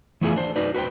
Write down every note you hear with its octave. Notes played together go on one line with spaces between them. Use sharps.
E3 A3 B3 E4 F4 G#4
D4 C5
D#4 F#4 B4 D5
F#4 B4 C5 G5